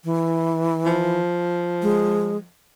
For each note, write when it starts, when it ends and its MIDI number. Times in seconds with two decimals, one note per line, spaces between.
0.04 1.20 52
0.86 2.45 53
1.82 2.37 56